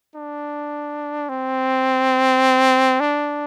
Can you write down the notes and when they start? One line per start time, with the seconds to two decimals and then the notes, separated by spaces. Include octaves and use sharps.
0.16 D4
1.29 C4
3.00 D4